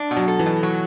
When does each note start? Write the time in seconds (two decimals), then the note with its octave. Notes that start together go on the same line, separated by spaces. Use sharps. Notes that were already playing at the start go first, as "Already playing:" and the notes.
Already playing: D4
0.11 B2
0.17 F#3
0.28 A4
0.39 E3
0.46 B2
0.63 F#3